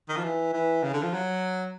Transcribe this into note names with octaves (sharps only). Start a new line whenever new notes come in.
D#3
F3
E3
E3
C#3
D3
F3
F#3